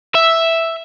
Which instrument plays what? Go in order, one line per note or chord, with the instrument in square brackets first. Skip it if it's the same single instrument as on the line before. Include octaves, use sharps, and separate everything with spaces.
[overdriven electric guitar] E5